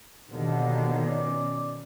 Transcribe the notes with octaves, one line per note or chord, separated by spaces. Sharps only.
D#2 B2 D3 D#3
C#4 D5